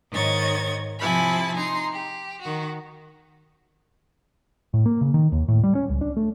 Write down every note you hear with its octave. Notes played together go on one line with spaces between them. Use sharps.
G#2 D#3 C#5 D#5 G#6 A6
C3 F3 E4 G#5 A5 B5
D#4 A#5 C6
G4
D#3 F#4
A2
A#3
C#3
D#3
D#2
A2
G3
C#4
C#2
D4
A3